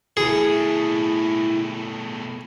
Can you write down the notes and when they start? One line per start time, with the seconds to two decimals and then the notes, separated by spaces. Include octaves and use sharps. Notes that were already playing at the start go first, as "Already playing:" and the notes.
0.17 B2 A3 E4 G#4